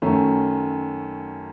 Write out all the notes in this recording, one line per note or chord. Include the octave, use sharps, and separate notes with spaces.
F#2 D#3 A3 C#4